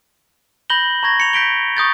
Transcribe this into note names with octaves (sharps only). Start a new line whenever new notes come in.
B5 G6 A#6 F#7 G7
A#5 C#6 G#6 A#6
C#7 F7
G6 B6 D7 G7
C#6 D#6 G6 A6